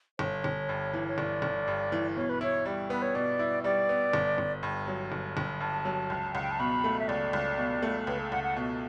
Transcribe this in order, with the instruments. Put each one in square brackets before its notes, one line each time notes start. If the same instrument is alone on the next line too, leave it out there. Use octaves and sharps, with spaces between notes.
[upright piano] G1 [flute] C#5
[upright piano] G1
G2
E3
[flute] C#5
[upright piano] G1 [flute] D5
[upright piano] G1
G2
E3
[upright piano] B2 [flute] C#5
[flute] B4
[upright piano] E4 [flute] C#5
[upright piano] G3
[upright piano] B3 [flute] B4
[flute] C#5
[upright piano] B2 [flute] D5
[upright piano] E4
[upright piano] G3 [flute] D5
[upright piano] B3
G1
G1
G2
F#3
G1
G1
[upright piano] G2 [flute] A5
[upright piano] F#3
C#2
[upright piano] C#2 [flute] F#5
[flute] G5
A5
[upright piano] B2 [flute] B5
[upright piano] A3
[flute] E5
[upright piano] C#2 [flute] D5
[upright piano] C#2
B2
A3
[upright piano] C#2 [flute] B4
[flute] A4
[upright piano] C#2 [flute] F#5
[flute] F#5
[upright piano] B2